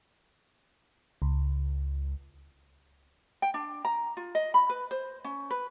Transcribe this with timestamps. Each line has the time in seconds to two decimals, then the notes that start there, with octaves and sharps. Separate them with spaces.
1.22 C#2
3.42 G5
3.54 D4
3.85 A#5
4.17 F4
4.35 D#5
4.54 B5
4.69 B4
4.91 C5
5.24 C#4
5.50 B4